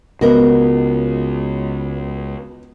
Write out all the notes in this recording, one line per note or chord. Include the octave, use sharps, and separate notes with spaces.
C#2 B3 F#4 A#4 D#5